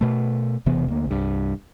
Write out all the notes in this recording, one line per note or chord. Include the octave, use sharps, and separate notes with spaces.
B2 A3
E1 C3 E3 B3
D2 A#3
C2 G2